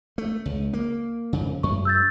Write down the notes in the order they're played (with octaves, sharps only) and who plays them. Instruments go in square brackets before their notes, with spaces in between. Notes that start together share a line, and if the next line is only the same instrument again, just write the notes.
[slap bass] A3
C#2
A#3
F2 C#3
[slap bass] F#2 [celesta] C#6
[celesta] E6 G6 A6